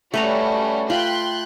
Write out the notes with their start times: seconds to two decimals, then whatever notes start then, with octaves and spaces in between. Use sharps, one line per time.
0.14 G3 A3 C#4 F#4 B4 A#5
0.90 F4 G5 B5 C6 F#6